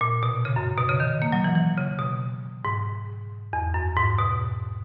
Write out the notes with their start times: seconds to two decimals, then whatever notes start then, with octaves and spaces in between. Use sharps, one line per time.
0.01 A#2
0.23 B2
0.45 C#3
0.56 F#2
0.78 B2
0.89 C#3
1.00 D#3
1.22 A#3
1.32 F#3
1.44 E3
1.55 E3
1.77 C#3
1.99 B2
2.65 G#2
3.53 E2
3.74 F#2
3.97 G#2
4.19 B2